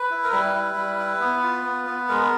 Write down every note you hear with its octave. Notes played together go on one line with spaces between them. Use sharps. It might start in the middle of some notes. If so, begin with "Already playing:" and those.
Already playing: B4
E4
A#4
G3 B4
E4
G3
E4
B3
F4
B3
B3
G#3 A#4